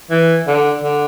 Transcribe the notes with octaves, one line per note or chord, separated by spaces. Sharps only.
E3
D3
D3